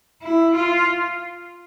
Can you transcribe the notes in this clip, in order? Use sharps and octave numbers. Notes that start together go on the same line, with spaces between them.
E4
F4